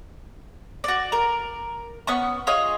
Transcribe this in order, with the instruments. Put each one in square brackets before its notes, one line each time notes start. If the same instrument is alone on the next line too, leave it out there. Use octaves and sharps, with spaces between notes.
[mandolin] F#4 D5
A#4
B3 C#4 C#6
F4 G#4 C#5 D#5